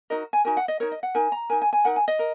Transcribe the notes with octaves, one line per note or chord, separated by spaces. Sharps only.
D#4 F#4 A#4 D#5
G#5
D#4 F#4 A#4 G#5
F#5
D#5
D#4 A#4 C#5
D#5
F#5
D#4 A#4 G#5
A#5
D#4 A#4 G#5
G#5
G#5
D#4 A#4 F#5
G#5
D#5
A#4